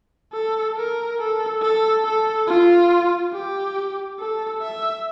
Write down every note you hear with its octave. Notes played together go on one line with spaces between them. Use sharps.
A4
A#4
A4
A4
A4
F4
G4
A4
E5